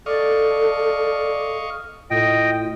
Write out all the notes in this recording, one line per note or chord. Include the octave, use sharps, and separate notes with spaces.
A4 D5 D#5 F5 C#6
A2 F4 D#5 G5